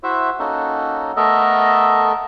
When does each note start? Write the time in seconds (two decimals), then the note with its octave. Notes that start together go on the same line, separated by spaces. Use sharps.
0.03 E4 F#4 C5 E5
0.39 A#3 C#4 D#4 F#4 A4
1.16 A3 B3 A4 A#4 D#5 E5